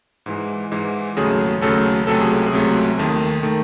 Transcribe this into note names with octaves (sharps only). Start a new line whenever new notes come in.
G#2 E3 G#3
G#2 E3 G#3
D#2 C#3 F#3 A3 G#4
D#2 C#3 F#3 A3 A4
C#2 C3 F#3 A3 A4
G#4
G#4
C#2 C3 F#3 A3
D#2 D#3 A3
D#3 A3